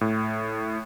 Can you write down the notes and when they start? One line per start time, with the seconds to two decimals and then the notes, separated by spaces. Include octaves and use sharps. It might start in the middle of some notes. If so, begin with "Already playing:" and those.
0.01 A2